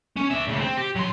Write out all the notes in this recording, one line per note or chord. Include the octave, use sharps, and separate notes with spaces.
C#4
D5 E5
D2 C#3
C4
G4
F#3 C6